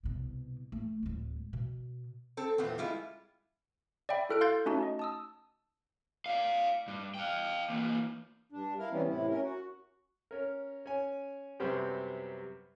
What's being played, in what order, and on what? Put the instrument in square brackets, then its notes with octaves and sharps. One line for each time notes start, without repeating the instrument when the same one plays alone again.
[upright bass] C2 B2
A3
D1 G#3
B2
[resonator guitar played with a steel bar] C4 A4
E2 A#2 B3 C4
G3 G#3 E4 F4
[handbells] D5 E5 G5 B5
E4 F#4 A4 F6 F#6 D7
F5 C6 F#6 G6 A6
A3 C#4 D#4 F#4 A5
D#5
A5 D#6 E6
[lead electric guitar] D5 F5
G2
F5 G5
E3 A#3
[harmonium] G2 D4
E4 A#4 F5
C3 E3 G3 B3 C#4
A2 C3 E4
C#4 A#4
F#4
[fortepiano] C#4 A#4
C#4 G#5
F#2 C3 G3 B3 C4 G4